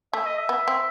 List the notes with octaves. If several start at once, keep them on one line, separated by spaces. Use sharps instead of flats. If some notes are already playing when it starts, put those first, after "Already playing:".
A3 E5
D#5
E5
B3
C4